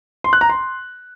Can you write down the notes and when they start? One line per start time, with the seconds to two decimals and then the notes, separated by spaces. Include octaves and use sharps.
0.24 C6
0.33 F#6
0.41 A#5
0.49 C6